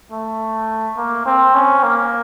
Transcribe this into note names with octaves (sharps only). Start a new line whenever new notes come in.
A3
A#3
C4
C#4
A#3